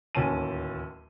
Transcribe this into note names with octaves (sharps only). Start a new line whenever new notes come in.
D1 D#2 C#4 A5 D#7